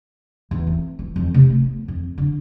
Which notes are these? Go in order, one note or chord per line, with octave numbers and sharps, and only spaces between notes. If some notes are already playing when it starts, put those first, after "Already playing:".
E2
C4
E3
F2
C3
A3
B3
F2
D3